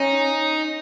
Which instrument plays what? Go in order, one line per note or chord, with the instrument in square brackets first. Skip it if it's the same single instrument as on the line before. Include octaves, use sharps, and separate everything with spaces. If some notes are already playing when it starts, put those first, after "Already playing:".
Already playing: [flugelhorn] C#4 [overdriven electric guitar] D#4